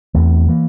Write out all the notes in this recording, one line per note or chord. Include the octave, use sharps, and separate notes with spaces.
E2 E3 A3 C4
E3 A#3